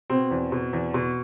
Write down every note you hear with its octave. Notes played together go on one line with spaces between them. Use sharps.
B2 C4
E2
B2
E2
B2